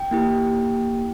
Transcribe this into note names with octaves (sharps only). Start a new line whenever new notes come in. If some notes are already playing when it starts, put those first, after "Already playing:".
Already playing: G5
A#3 E4 G4